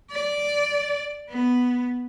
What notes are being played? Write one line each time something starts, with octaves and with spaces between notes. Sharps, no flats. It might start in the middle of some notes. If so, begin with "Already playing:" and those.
D5
B3